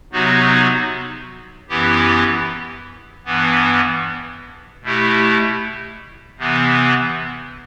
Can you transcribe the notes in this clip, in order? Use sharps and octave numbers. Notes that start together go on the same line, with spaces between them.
C3 F#3 B3 D#4 F#4
F#2 E3 B3 E4 G4
G2 E3 B3
B2 A3 E4 G4
C3 E3 B3